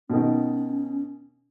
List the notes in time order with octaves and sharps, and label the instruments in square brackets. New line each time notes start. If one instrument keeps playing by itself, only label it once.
[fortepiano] B2 D#3 [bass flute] C#4